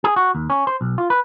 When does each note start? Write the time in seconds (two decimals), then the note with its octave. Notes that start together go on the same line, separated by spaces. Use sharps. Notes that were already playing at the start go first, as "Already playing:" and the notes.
0.04 G#4
0.16 F#4
0.35 D#2
0.50 C#4
0.67 C5
0.81 B1
0.98 F4
1.10 B4